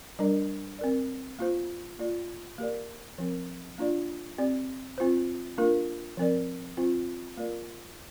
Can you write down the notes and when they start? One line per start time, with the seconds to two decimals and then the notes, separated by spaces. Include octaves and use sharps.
0.19 G3 D4 A#4 D5
0.79 C4 A#4 D5
1.39 A#3 F4 C5
1.99 A#3 F4 D5
2.58 A#3 G4 A#4 D5
3.18 F3 C4 A#4
3.78 A#3 D4 F4 D5
4.38 C4 G4 D5
4.98 C4 F4 C5
5.57 A#3 D4 F4 A#4
6.17 F3 C4 A#4 D5
6.77 C4 F4 C5
7.37 A#3 F4 A#4 D5